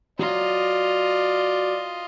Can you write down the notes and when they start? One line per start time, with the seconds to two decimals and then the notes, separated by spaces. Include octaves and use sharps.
0.19 F#3 F4 D5 D#5